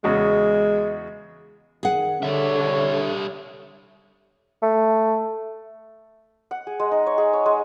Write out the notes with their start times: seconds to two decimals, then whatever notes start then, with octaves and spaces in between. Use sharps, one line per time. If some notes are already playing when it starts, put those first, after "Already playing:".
0.04 E2 C#3 G#3 F#4
1.83 D#3 G#4 F#5
2.23 D3 G3 C#5 E5
4.62 A3
6.51 F#5
6.67 G#4
6.80 G#3
6.91 D#4
7.06 C#5
7.18 G#4
7.33 C#5
7.46 G#3